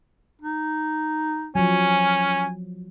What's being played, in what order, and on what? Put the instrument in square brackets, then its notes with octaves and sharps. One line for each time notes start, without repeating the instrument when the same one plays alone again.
[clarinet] D#4
[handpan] F3 F#3 [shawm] C#4 [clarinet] G#5